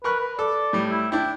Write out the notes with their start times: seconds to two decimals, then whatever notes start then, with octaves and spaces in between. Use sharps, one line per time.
0.04 A#4 B4 C#6 F#6
0.21 B4
0.39 A4 D5
0.73 A2 G3
0.90 E4
1.12 D4 E4 G5